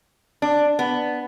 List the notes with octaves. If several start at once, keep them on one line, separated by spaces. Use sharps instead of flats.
D4
B3